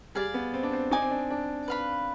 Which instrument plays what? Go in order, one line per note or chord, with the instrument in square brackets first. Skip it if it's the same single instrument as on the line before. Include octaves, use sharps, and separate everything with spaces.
[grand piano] G3 [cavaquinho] G#4 D5 F5
[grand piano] B3
C4
D4
C4
[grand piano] D#4 [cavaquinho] D5 G#5 D6
[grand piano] C4
D4
D4
[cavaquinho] B4 F5 B5